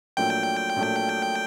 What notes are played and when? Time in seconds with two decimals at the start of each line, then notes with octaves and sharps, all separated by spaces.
0.17 A#1 A#2 F#3 A3 G5
0.76 A#1 A#2 F#3 A3